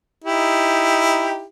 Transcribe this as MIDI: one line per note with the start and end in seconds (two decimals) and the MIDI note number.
0.24 1.44 63
0.24 1.44 64
0.24 1.44 67